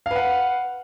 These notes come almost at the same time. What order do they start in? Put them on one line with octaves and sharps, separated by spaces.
F5 B4 F#5